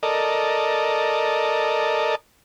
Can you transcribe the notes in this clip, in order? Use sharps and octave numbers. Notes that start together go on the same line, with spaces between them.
A4 A#4 D5 D#5